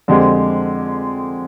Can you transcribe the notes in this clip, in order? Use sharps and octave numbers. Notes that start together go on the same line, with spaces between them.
F2 D3 G#3 C4 G4